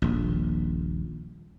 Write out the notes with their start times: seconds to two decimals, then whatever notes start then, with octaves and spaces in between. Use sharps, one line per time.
0.02 D#1 A#1